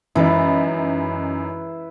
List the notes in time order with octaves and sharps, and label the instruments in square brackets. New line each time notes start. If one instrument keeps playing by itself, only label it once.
[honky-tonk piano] F#2 D#4 [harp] E3 G#3 A6 [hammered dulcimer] E4 B4